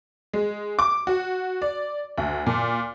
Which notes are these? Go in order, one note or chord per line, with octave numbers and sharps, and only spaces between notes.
G#3
D6
F#4
D5
D2
A#2